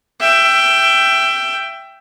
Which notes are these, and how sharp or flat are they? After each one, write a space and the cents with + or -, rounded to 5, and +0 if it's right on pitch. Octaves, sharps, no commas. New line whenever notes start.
E5 +20 G5 +0